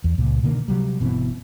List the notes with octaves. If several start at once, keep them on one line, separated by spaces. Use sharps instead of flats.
E2
C#2 A#2
B2 D3 D#3 A#3
C3 F#3 G3
G1 B2 E3 C4